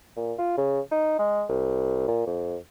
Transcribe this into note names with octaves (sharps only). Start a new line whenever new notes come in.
A#2
F4
C#3
D#4
G#3
C2
A#2
F2